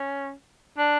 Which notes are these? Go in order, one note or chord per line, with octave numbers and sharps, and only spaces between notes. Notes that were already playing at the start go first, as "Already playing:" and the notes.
Already playing: C#4
D4